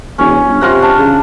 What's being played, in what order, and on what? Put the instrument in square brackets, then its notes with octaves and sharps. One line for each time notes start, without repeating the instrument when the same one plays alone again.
[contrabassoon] E1 [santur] C#4
[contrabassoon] G1
[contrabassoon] C3 [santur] F4 A#4 F#5
[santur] D4
[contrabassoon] C#3